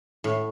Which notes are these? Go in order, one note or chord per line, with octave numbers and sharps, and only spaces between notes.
A2